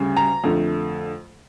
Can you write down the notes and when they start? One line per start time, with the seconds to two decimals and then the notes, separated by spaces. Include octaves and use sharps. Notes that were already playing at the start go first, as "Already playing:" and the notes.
Already playing: D2 C#3 G3
0.17 A#5
0.44 F2 D3 A3